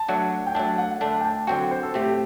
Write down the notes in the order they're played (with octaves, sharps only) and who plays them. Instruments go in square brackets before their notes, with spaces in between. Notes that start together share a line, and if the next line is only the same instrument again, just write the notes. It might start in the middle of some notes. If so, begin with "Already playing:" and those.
Already playing: [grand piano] A5
[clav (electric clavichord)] F#3 A3 D4 F#4
[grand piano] G5
[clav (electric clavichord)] F#3 A3 D4 [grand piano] A5
[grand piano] F#5
[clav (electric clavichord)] D3 A3 D4 [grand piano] A5
[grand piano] G5
A5
[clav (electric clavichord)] D3 F#3 C4 F#4 [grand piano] G5
[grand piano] C5
A4
[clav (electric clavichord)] A2 A3 C4 [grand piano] G4